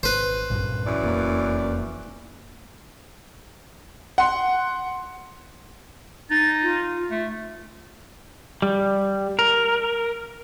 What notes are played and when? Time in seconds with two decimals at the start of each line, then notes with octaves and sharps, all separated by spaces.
0.03 G#1 B4 C5
0.50 B1 G2 A#2
0.87 F#2 E3 D5
1.01 E1 F2 A#3
4.18 F#5 C6
6.31 D#4 A6
6.63 F4
7.11 A3
8.62 G3
9.39 A#4